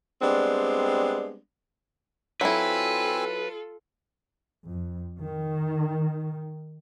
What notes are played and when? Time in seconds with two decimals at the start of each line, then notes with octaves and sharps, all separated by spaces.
0.22 G3 G#3 B3 C4 D4
2.41 F#3 C4 E4 F4 A4 B4 G#5 E6
4.67 F2
5.19 D#3